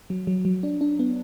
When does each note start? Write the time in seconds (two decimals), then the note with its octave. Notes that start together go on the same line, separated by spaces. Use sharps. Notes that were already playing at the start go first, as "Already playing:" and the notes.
0.10 F#3
0.27 F#3
0.45 F#3
0.63 D4
0.81 D4
0.99 B3